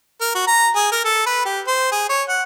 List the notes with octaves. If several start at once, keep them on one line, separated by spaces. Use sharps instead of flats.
A#4
F#4
A#5
G#4
A#4
A4
B4
G4
C5
G#4
C#5
F#5